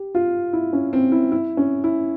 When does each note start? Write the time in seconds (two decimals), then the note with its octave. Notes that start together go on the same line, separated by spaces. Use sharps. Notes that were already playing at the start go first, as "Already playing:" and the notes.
Already playing: G4
0.15 F4
0.53 E4
0.73 C#4
0.93 C4
1.12 E4
1.32 E4
1.57 C#4
1.84 E4